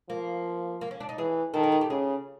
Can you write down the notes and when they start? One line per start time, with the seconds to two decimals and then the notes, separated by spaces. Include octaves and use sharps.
0.09 F3 A#3
0.81 A#3
0.91 C#4
1.00 D4
1.09 D#4
1.17 E3 G#4
1.54 D#3 A4
1.63 A#4
1.72 G#4
1.81 G4
1.90 C#3 G#4